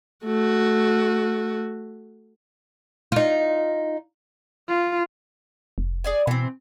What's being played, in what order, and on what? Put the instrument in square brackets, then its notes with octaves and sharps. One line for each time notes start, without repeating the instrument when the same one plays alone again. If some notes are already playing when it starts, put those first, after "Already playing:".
[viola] A3 F#4
[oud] D#4 F4
[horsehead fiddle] F4
[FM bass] F1
[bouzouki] G#4 D5 G#5
[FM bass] B2 [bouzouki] E3 C4